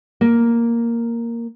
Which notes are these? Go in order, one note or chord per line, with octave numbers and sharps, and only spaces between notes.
A#3